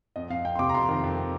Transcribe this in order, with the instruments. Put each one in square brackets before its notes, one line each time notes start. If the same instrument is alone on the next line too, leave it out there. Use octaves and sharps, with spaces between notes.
[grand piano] F2 D#5
F2 F5
F2 G5
C6
C3 D6
A#5
F2 C6
D#3
F2